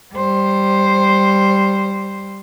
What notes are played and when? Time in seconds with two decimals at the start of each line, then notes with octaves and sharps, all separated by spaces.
0.14 G3 C5